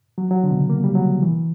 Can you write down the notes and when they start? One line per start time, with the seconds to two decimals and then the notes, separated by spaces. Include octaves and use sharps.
0.18 F#3
0.31 F#3
0.44 D3
0.51 B2
0.56 C#3
0.70 A#3
0.84 G3
0.95 F#3
1.22 E3